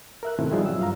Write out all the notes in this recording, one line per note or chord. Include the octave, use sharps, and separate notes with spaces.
A#4 E5 F#6
G#2 B2 D#3 A3 C4 E4
F3 G3 D#4 F4 G#4 E5
F#3 E6
G2 F5 A#5